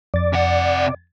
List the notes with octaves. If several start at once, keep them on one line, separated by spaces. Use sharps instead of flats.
F2 D5 A6
C3 F#5